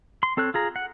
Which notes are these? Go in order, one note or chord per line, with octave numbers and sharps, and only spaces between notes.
C6
C4 A4 C#5 F#6
F4 G#4 A#5
F#5